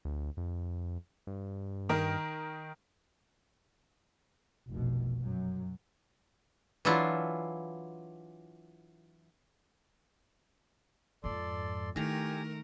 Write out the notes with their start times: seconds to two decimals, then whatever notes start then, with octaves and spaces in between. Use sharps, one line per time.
0.05 D2
0.37 F2
1.27 G2
1.89 D#3 A#4
4.69 F1 A#1 B2
5.21 F#2 F#3
6.85 E3 F#3 D4 E4 F4
11.24 F2 G#2 A4 D5 C6
11.96 D#3 A3 E4 G4 A#4 G#5 A#5